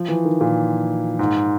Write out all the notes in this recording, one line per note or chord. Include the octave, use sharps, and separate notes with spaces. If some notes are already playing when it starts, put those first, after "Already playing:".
Already playing: F3
E3
D#3
A#2
G#2